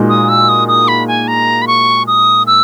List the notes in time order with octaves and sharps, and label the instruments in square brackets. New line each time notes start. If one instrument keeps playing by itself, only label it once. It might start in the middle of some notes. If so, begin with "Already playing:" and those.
Already playing: [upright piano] A#2 G#3 D#4 F#4
[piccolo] D#6
E6
D#6
D#6
B5
G#5
A#5
B5
C#6
D#6
E6